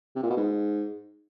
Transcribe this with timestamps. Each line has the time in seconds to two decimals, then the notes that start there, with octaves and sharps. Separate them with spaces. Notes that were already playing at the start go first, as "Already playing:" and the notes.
0.16 C3
0.23 A#2
0.30 B2
0.37 G#2